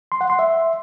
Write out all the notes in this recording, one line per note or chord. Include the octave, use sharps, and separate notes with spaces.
C6
F#5
C6
E5